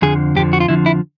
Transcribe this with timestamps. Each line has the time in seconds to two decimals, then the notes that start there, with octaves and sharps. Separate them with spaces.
0.02 F2 D3 F3 G#4
0.36 F2 D3 F3 G4
0.53 F#4
0.60 F4
0.68 F2 D3 F3 E4
0.86 E4